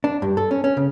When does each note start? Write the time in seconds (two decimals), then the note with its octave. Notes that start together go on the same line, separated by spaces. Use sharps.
0.04 D4
0.22 G2
0.37 A4
0.51 C#4
0.64 C#4
0.77 C#3